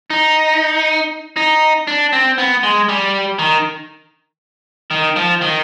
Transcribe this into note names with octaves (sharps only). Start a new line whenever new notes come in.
D#4
D#4
D4
C4
B3
G#3
G3
D#3
D#3
F3
D#3